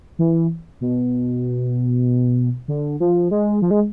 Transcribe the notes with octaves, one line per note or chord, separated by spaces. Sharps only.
E3
B2
D3
F3
G#3
F3
G#3